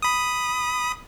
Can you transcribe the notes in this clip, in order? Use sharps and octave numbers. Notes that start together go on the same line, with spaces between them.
B5 D#6